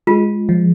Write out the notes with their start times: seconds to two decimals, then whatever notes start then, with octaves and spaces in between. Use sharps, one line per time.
0.07 G#3 F4
0.49 F3